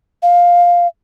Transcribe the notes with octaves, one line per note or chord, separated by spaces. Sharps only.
F5